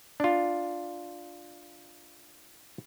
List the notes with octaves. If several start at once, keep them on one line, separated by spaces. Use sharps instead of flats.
D4 F4